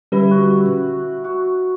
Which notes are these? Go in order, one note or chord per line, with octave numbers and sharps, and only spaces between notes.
D3 G3 C#4 E4 G4 B4
F#4
F#4